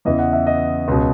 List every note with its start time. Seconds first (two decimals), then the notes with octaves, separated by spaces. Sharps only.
0.05 E2 C#3 E3 D#5
0.19 F#5
0.33 E5
0.47 D#5
0.88 C#2 B2